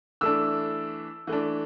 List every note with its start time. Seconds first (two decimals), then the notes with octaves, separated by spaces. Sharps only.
0.21 E3 A3 D4 E6
1.27 E3 A3 D4